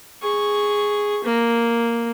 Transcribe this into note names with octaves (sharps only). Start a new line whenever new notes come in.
G#4 C#6
A#3